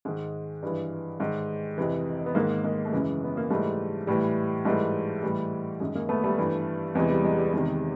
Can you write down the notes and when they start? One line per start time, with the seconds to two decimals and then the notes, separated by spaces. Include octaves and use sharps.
0.05 G#2 D#3 G#3
0.62 G2 E3
1.20 G#2 D#3
1.78 F2 C3 E3
2.26 B3
2.35 G#2 D#3 G#3 A#3
2.64 G#3 A#3
2.85 A3
2.93 F#2 C#3 E3 G#3
3.24 B3
3.37 A#3
3.50 G#2 E3 G3 A3
4.07 A2 E3 G3
4.65 G#2 E3 G3 A3
5.23 A2 E3 G3
5.80 F#2 D#3 G#3
5.95 G#3 A#3
6.09 A3 B3
6.24 G3 A3
6.38 G2 E3
6.95 E2 C3 E3 G#3
7.10 G3
7.24 G#3
7.39 G3
7.53 E2 C3 D#3 G#3